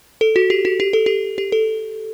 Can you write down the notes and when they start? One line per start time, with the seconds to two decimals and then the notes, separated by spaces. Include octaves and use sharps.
0.21 A4
0.36 F#4
0.50 G4
0.65 F#4
0.80 G4
0.93 A4
1.06 G4
1.38 G4
1.52 A4